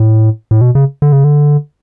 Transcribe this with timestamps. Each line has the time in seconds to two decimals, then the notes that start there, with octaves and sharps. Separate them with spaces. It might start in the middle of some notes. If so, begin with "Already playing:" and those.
Already playing: A2
0.51 A2
0.61 B2
0.75 C#3
1.02 D3
1.12 C#3
1.24 D3